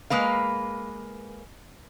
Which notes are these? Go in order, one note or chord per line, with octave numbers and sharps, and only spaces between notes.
G#3 A#3 B4 F5